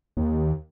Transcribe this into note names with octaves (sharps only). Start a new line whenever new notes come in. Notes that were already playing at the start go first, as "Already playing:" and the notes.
D#2